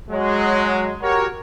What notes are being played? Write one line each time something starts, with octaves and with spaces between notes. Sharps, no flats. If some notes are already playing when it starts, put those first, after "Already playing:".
F#3 G#3
F#4 G4 A#4 C#5